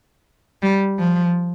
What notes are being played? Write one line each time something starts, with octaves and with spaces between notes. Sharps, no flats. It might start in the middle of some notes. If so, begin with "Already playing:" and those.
G3
F3